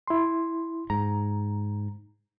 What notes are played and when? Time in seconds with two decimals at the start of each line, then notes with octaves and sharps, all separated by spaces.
0.07 E4 C6
0.90 G#2 A#5